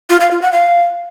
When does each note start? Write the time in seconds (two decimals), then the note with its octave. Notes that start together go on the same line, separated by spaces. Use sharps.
0.10 F4
0.20 F5
0.31 F4
0.42 F#5
0.52 F5